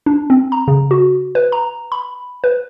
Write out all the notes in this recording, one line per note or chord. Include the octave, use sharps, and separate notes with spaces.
D4
C4
A#5
C#3
F#4
B4
A#5
B5
B4